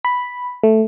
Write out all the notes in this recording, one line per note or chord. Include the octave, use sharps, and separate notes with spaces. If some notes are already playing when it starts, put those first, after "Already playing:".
B5
A3